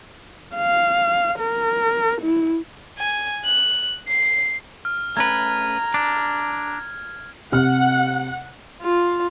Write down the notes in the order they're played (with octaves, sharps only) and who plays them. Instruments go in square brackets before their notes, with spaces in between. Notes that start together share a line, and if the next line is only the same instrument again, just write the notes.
[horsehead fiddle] F5
A#4
E4
[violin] G#5
F#6
C7
[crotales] F6
[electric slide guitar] A3 C#4 B4 [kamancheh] A#5 [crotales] G#6
[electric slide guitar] D4
[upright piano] C3 F6 [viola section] F#5
[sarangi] F4